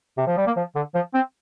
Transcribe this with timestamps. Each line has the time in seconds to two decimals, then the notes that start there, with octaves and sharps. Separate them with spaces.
0.18 C3
0.27 F3
0.37 G3
0.47 A#3
0.57 F3
0.75 D3
0.95 F3
1.14 C4